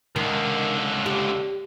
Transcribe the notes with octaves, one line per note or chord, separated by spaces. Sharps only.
C#2 D3 D#3
G4